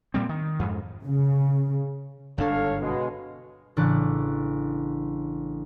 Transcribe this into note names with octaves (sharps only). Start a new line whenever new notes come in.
A#2 G3 C4
D#3
F2 G#2
C#3
G1 G#2 D4 A4 C#5 F5
B2 G#3
A1 C#3 D4 D5 F#6